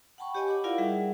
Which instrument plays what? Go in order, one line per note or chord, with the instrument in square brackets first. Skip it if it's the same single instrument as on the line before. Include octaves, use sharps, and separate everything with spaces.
[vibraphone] F#5 G5 A5 B5 C#6
G4 C#5 D#5 G#5
F#5 B5 D6
E4 F4 A#4 D5 F5 F#5
G3 D#4 G#4 E5 F#5